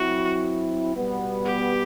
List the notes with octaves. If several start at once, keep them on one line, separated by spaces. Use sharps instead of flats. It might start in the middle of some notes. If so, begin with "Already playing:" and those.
Already playing: F#3 C4 E4 F#4
B2 G3 B3
G4